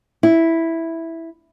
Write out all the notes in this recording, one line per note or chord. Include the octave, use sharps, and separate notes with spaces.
E4